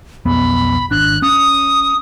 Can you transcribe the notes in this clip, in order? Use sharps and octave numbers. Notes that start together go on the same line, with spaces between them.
B1 F2 B3 B5
G#1 D4 F#6
C#4 D#6